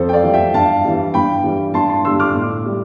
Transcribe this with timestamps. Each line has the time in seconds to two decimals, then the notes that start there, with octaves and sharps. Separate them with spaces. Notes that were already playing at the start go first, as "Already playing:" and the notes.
Already playing: F2 A4 C5
0.09 G5
0.13 D5 F5
0.23 E3 G3
0.34 E5 G5
0.54 G2 F5 A5
0.85 E3 G3
1.14 G2 G5 B5
1.44 E3 G3
1.74 G2 A5 C6
1.90 A5 C6
2.05 D3 G3 C6 E6
2.20 D6 F6
2.35 A2
2.66 G3